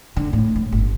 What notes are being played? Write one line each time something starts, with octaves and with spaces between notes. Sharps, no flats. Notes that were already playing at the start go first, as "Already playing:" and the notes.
D3
A2
A2
G1